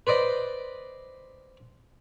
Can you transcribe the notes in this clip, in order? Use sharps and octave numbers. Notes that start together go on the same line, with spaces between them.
B4 C5 D5 D#5